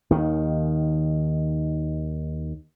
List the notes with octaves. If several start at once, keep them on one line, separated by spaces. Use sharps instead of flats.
D#2 D#3